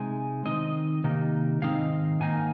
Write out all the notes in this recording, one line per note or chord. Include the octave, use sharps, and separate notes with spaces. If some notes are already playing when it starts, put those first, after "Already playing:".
Already playing: C3 G#3 D#4 G#5
D#3 C4 D#4 D#5
C3 D#3 A#3 D#4
G#2 D#3 C4 D#4 F5
G#2 D#3 A#3 D#4 G#5